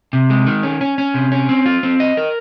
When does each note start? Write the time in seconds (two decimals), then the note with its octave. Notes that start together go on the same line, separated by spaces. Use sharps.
0.13 C3
0.30 G#3
0.47 D#3
0.63 C#4
0.81 C#4
0.98 C#4
1.14 C3
1.32 C#4
1.49 C4
1.66 F4
1.83 C4
2.00 D#5
2.17 A#4